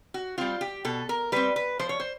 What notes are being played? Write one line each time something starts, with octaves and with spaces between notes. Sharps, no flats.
F#4
G3 C4 F4
G4
B2 A4
A#4
G3 C4 B4
B4
F3 C5
C#5
C5